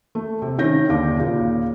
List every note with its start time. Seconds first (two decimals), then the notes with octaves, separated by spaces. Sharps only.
0.15 A3
0.42 C3
0.58 C3 D#3 C#4 G6 A#6
0.90 D#2 D3 D6
1.20 D#2 A#2 C#3